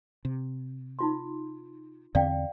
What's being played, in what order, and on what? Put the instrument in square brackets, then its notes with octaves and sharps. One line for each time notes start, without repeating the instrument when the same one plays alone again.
[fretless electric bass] C3
[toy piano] D#4 F4 C6
[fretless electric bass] E2 D3 C4 [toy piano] D5 F5 G5